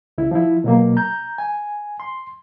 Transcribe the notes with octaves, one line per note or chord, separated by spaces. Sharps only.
C#2 E4
F3 E4
B2 F#3 A#3
A#5 G6
G#5
C6